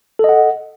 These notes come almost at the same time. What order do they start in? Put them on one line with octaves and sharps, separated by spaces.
A4 D#5 F#5